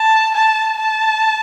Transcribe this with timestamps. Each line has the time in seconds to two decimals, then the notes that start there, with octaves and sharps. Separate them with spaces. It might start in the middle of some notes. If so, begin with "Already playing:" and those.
Already playing: A5
0.34 A5
0.78 A5